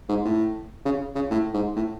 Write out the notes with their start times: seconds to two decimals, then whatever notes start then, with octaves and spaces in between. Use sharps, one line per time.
0.09 G#2
0.25 A2
0.85 C#3
1.15 C#3
1.31 A2
1.54 G#2
1.76 A2